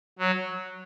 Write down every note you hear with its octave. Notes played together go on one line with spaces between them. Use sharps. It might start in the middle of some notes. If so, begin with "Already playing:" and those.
F#3